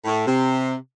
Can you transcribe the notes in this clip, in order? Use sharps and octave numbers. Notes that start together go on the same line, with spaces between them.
A2
C3